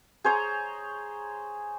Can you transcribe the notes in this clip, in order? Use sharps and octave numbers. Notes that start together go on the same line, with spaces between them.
G#4 C5 C#5 A#5